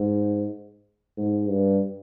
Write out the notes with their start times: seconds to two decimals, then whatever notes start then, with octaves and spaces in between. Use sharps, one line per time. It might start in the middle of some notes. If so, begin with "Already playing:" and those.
Already playing: G#2
1.17 G#2
1.49 G2